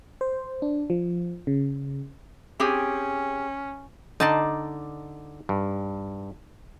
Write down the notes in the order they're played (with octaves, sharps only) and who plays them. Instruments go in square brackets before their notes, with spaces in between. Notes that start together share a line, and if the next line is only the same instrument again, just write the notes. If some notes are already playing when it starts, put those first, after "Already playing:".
[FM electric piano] C5
D4
F3
C#3
[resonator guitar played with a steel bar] C4 G4 G#4 [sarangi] C#4
[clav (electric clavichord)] D3 D5 [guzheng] D#4 A5 C6
[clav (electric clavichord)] G2